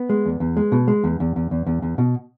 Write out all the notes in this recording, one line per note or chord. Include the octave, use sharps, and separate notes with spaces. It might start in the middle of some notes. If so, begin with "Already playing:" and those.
Already playing: B3
G#3
E2
E2
G#3
B2
G#3
E2
E2
E2
E2
E2
E2
B2